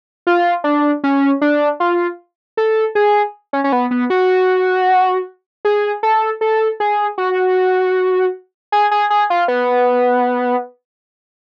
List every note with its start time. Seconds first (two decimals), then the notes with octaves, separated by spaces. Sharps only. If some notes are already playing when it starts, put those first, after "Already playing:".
0.27 F4
0.64 D4
1.04 C#4
1.41 D4
1.80 F4
2.57 A4
2.95 G#4
3.53 C#4
3.64 C#4
3.72 B3
3.91 B3
4.10 F#4
5.65 G#4
6.03 A4
6.41 A4
6.80 G#4
7.18 F#4
8.72 G#4
8.91 G#4
9.10 G#4
9.30 F4
9.48 B3